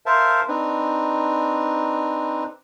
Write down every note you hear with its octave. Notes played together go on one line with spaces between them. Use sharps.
A#4 C5 E5 F5 A5
C4 D4 D#4 B4